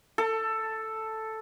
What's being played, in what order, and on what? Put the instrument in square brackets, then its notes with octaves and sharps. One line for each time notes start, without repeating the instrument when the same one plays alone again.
[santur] A4